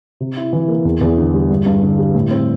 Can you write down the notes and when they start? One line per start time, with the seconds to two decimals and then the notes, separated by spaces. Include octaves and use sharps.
0.20 C3
0.37 E4
0.53 E3
0.68 A#3
0.85 E2
1.01 E2
1.18 D3
1.34 G3
1.50 G2
1.66 G2
1.83 D3
1.99 G3
2.15 A2
2.31 C4